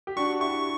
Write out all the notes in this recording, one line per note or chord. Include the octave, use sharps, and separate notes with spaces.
G4
D4 F#4 C#6
E4 G4 C#6